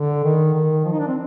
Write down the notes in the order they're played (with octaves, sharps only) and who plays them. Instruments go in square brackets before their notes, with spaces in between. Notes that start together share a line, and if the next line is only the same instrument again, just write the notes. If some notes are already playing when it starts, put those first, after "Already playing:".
Already playing: [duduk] D3
D#3
D#3
F3
D#4
D4
C4